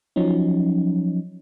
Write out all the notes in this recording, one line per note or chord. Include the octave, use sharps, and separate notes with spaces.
F3 F#3 C#4 D#4